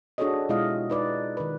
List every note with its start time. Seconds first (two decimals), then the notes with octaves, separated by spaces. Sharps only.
0.18 D4 F#4 G#4 A4 C#5 D#5
0.49 B2 G#3 E4 F4 D#5 F5
0.90 D#4 B4 D5 D#5
1.37 D#3 B4